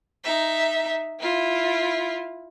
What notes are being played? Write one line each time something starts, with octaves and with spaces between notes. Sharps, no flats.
D#4 E5
E4 F4